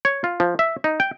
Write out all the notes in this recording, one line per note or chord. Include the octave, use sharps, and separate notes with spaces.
C#5
F4
F3
E5
D#4
G5